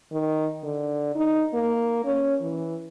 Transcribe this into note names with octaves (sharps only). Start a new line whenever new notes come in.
D#3
D3
D#4
A#3
C#4
E3